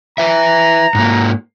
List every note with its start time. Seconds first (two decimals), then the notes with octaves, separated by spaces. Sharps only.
0.18 B4 E5 A#5
0.95 G#2 A#3